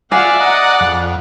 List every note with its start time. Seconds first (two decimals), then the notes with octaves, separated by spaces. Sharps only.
0.12 F4 G#4 D5 E5 F#5
0.40 D#5 F#5 A#5
0.80 F2